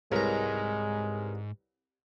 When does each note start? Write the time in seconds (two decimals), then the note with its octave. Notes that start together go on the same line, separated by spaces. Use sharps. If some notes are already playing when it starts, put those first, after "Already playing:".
0.12 C2 G#2 G#3 A#4 B4 C#5 A#5